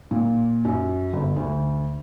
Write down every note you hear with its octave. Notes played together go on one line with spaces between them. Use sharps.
A#2
F#2
G1
D2